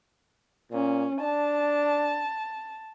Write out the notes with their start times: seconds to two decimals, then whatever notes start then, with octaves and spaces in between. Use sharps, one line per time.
0.72 A#2 C#4
1.21 D4 A5